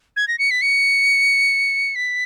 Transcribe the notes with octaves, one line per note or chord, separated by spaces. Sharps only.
G#6
A#6
C#7
B6
C#7
B6